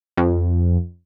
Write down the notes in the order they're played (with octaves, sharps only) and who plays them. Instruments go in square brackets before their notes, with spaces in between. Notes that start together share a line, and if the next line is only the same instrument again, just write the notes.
[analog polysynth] F2